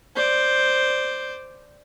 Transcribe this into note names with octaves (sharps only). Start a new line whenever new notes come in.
C5 D5